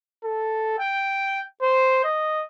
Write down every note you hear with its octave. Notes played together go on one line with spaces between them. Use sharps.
A4
G5
C5
D#5